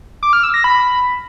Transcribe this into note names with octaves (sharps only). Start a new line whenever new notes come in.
D6
F6
E6
A#6
B5